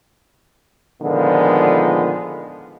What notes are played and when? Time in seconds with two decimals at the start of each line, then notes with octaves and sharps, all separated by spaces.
1.02 A#2 D3 D#3 F3 G#3 B3